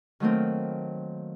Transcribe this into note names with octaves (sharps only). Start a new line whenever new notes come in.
D#3 F#3 A3 A#3 C4